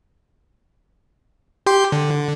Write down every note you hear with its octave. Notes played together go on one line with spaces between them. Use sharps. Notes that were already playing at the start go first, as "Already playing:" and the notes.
G4 G5 C6
D3